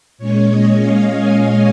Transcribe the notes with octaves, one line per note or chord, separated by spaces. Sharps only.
A#2 G#3 C#4 C#5
D#5
F5
G#5